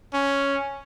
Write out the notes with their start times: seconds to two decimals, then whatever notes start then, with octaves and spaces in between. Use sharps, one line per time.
0.14 C#4